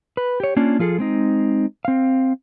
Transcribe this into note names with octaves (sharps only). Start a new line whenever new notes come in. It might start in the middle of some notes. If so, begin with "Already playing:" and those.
B4
G4 C#5
A#3 C#4 D4 F4
F3 F4 G#4 A4
G#3 C4 D#4
C4 F5